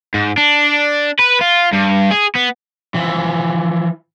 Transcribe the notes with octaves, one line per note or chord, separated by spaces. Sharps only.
G#2
D4
B4
F4
G2
G#4
B3
E3 F3